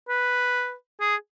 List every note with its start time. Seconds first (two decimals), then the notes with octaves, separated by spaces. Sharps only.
0.09 B4
1.01 G#4